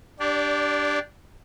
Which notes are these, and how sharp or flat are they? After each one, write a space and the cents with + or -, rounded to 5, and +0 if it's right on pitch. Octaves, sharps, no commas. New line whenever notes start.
D4 +0 G4 +0 D5 -25